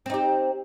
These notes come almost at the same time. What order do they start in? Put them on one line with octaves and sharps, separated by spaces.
C4 D#4 G4